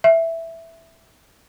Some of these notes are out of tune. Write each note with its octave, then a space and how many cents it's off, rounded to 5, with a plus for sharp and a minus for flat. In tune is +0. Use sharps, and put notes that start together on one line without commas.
E5 +5